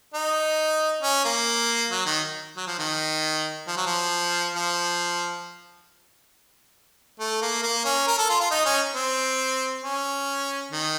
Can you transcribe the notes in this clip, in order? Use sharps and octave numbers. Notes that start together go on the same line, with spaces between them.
D#4
C#4
A#3
F#3
D#3
F#3
F3
D#3
F3
F#3
F3
F3
A3
A#3
A#3
C#4
A#4
A4
F4
F4
D#4
C#4
C4
C#4
D#3